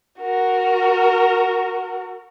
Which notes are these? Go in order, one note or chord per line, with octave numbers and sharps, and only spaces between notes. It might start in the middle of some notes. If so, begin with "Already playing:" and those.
F#4 A#4